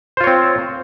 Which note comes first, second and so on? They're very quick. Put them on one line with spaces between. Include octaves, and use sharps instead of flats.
C5 F4 C#5 C4